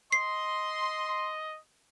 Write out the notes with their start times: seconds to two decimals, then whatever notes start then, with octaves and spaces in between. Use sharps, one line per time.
0.12 D#5 C6 C7